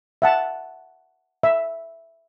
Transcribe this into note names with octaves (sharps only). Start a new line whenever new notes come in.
E5 F#5 A5
E5